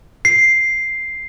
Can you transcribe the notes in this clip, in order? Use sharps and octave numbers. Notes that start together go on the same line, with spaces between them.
C7